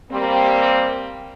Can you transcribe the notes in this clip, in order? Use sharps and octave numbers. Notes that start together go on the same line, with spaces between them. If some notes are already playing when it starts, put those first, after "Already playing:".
G3 A#3 C4